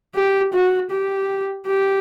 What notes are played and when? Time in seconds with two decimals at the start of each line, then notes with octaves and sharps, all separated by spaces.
0.15 G4
0.53 F#4
0.90 G4
1.66 G4